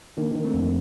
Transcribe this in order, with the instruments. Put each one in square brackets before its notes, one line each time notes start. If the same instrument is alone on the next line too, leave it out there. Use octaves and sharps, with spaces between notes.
[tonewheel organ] D#3 [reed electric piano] A#3 D4
[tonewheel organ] D#3
[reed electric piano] A3 C4
[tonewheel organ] F2